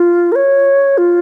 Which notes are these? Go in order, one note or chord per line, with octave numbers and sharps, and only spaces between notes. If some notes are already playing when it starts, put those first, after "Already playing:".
Already playing: F4
A#4
C#5
F4